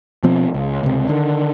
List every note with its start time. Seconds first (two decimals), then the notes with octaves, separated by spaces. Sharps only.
0.23 B2 F3 C4
0.54 C#2
0.83 C#2 C3
1.09 D3 D#3